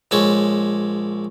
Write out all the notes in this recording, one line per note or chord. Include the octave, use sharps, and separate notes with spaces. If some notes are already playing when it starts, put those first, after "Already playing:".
A#1 G#3 A4 C#5